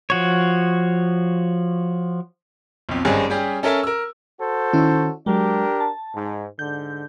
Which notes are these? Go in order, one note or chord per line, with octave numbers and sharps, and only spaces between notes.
F3 F#4 C#5
B1 F2
G#1 G2 G#3 C#4 G#5
G3 C#4 G4 G#4
C#4 A4 A#4 E5 G#5 A5
A#4 E6
F#4 A4 C5
D#3 C#4 E4
F#3 G#3 D4 G4 A#4
A5
G#2
G#2 D3 G6